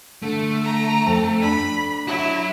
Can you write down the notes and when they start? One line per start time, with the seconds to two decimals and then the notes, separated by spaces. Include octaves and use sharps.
0.23 D3 A3
0.64 A#5
1.06 F2
1.42 D4 B5
2.07 E4 F#4 C#5